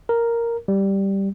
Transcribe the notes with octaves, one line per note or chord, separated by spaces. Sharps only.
A#4
G3